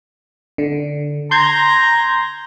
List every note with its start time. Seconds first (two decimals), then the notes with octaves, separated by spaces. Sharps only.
0.58 D3
1.31 A#5 C6 G6 G#6